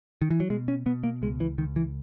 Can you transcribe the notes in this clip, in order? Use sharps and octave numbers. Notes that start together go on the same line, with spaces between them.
D#3
E3
F#3
B2 G#3
C#4
B2 B3
A#3
C#2 G#3
E3
C#2 D#3
E3